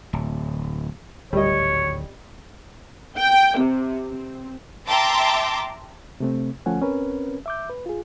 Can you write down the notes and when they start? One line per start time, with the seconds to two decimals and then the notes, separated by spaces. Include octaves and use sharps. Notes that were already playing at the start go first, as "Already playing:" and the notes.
0.13 D1
1.33 D1 G#1 D2 G3 C#5 D#5
3.18 G5
3.58 C3
4.08 C4
4.88 E5 G5 A5 A#5 C6 D6
6.20 C3 A3 C4
6.66 D2 F3 A3 C#4 F#5 G#5
6.81 C4 C#4 A#4 B4
7.46 E5 D6 G6
7.70 B4
7.86 F4 G#4